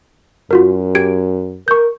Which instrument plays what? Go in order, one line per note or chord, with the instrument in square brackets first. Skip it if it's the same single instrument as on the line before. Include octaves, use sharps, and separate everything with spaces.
[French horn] F#2 [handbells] F4 F#4 A#4
[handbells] G4 G#6 D7
[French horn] A#4 [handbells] C#6 G6